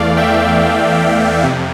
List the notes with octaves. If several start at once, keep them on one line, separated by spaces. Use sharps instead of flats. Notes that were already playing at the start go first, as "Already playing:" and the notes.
Already playing: E2 E3 A3 D5 F5
E5 G5
F2 C3